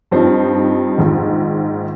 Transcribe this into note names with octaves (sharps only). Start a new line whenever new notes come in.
G2 F3 C4 D#4
A#1 G#2 D#3